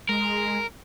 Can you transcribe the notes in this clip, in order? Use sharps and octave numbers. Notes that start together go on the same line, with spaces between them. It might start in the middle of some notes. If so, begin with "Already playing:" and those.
G#3 A#4